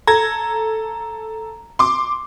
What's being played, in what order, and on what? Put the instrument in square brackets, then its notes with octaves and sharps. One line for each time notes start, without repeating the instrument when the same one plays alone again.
[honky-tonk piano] A4 G#6 [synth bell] A#5
[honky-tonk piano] C6 D6